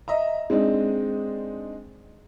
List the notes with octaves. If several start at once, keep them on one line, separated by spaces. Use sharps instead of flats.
D#5 E5 A#5
G#3 C4 D4 D#4